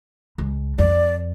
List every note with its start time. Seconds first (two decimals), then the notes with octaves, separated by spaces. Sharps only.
0.38 C#2
0.78 F2 D5